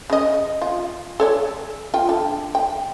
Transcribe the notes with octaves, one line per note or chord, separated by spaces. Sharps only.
C#3 D#5
F4
A4 C#5 D5
F4 G5
D3 A4
G5